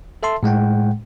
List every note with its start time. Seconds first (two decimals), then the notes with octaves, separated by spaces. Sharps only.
0.23 A4 E5 A5 C6
0.43 A2 G#3 F#5 G5